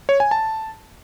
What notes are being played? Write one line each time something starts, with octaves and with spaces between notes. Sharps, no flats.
C#5
G#5
A5